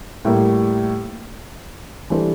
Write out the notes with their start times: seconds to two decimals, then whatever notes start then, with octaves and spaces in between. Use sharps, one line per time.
0.25 A2 G3 A#3
2.10 E3 G3 D4 A4 C5